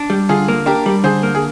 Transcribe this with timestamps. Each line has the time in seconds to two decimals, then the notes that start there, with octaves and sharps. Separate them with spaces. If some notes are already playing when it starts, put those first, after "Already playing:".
Already playing: D4
0.10 G3
0.29 D3 F4 G#4
0.48 A#3
0.66 D4 G4 A#4
0.86 G3
1.04 D3 G#4 C5
1.23 A#3
1.35 G#4